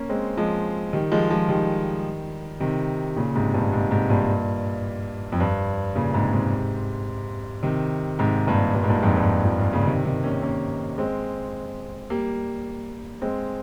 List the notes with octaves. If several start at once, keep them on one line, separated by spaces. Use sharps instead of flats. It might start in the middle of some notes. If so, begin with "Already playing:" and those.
Already playing: A#3 C#4
G#3 C4
F3 G#3
D#3 G3
F3 G#3
F3 G#3
D#3 G3
C3 D#3
A#2 C#3
G#2 C3
G2 A#2
G#2 C3
G#2 C3
G2 A#2
F2
G2
A#2 C#3
G#2 C3
G#2 C3
C3 D#3
G#2 C3
G2 A#2
G2 A#2
G#2
G2 A#2
F2 G#2
G2
F2
G2
A#2 C#3
C3 D#3
C3 D#3
A#3 C#4
A#3 C#4
G#3 C4
G3 A#3
G#3 C4